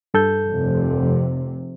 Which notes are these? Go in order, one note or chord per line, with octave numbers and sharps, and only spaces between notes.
G2 A4 G6
F1 C3